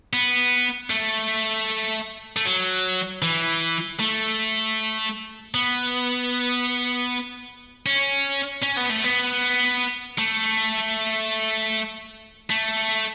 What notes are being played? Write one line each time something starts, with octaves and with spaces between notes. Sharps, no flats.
B3
A3
A3
F#3
E3
A3
B3
C#4
C#4
B3
A3
B3
A3
A3